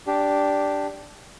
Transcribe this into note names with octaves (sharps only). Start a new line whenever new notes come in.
D4 G4